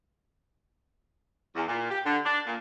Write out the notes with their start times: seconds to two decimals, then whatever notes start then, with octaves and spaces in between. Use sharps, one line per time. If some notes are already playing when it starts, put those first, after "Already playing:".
1.56 E2
1.68 A#2
1.90 G4
2.06 D3
2.25 D4
2.46 A#2